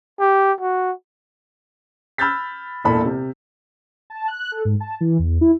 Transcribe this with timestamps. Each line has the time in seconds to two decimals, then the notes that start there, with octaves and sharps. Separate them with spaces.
0.19 G4
0.61 F#4
2.18 B5 E6 F6 G6 A6 B6
2.84 E1 A#2 E4 A4 B5
3.06 C3
4.10 A5
4.28 F#6
4.51 A4
4.65 G#2
4.80 A5
5.01 E3
5.19 E2
5.41 E4